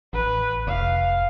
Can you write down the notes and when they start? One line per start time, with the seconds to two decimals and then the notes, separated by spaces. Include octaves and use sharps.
0.13 A1 B4
0.67 F1 F5